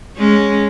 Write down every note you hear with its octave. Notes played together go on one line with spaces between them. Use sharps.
G#3 C#4